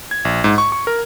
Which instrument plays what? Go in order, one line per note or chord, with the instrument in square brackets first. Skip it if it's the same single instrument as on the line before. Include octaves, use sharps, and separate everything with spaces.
[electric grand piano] G#6
A#1
G#2
C#6
C#6
A#4